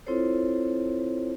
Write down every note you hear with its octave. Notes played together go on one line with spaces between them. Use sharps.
C4 E4 F4 A4 C5 C#5